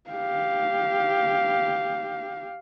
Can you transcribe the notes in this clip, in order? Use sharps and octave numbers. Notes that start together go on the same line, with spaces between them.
G4 F5